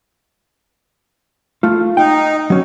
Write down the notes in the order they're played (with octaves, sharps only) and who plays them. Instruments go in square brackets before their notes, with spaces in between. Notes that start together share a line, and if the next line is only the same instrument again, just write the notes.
[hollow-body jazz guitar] A3 F4
[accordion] D#4 [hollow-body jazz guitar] G5
[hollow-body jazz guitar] F#3 C#4